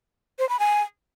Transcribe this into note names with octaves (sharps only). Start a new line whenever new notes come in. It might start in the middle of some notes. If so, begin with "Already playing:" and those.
C5
B5
G#5